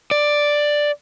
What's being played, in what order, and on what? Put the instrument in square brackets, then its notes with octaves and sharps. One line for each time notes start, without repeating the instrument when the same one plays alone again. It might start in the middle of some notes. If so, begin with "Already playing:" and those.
[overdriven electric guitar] D5